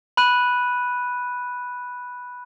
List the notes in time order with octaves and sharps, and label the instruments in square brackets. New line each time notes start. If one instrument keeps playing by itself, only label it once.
[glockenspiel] B5 F#6 D#7